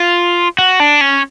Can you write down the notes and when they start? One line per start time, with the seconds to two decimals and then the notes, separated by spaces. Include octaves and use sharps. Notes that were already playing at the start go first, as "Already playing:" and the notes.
Already playing: F4
0.59 F#4
0.80 D4
1.01 C#4